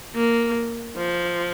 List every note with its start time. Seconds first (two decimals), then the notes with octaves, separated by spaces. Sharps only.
0.15 A#3
0.97 F3